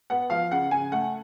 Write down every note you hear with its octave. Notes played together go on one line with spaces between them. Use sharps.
B3 F#5
F3 F5
C#3 F#5
C#3 G#5
A3 F#5